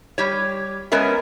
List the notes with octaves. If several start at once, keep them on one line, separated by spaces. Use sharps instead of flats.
G3 G4 C#5
G#3 B3 C#4 A#4 E5